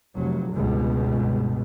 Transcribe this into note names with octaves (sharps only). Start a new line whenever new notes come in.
F1 F#3
G1 C#2 B2